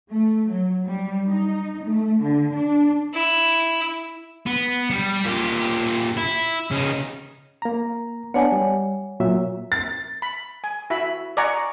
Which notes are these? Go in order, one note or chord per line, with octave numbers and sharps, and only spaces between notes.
A3
F#3
G3
D#4
A3
D3
D4
E4
B3
G3
A#2 G4
E4
C#3 D#4
A#3 A#5
B3 D4 C#5 F#5 G#5
G3
A#2 F#3 E5
A6
B5
G#5
E4 F#4 E5 B5
D5 D#5 F#5 G#5 A#5 C#6